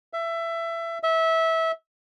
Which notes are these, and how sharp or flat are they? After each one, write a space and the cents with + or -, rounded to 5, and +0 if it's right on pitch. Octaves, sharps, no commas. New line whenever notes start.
E5 +20
E5 -20